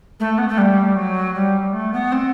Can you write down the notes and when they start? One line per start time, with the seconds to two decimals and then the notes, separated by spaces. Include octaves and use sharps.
0.19 A3
0.38 B3
0.48 A3
0.57 G3
0.95 F#3
1.34 G3
1.72 A3
1.92 B3
2.11 C4